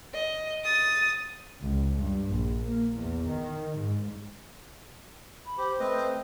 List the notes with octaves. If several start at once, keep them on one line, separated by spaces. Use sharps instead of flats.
D#5
D#6 A6
C#2
G2
A#1
A#3
E2
D#3
G#2
B5
G4 C5
A3 C4 B4 D#5